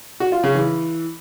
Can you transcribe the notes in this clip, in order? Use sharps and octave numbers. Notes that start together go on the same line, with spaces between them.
F#4
F4
C#3
E3